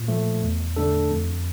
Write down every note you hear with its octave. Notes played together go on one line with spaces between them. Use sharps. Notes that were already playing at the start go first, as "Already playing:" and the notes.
Already playing: A#2
F3 A3
E2
D3 A3 D4 A4
F2